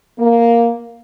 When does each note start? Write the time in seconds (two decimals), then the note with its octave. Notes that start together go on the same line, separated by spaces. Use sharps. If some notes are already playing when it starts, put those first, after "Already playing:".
0.18 A#3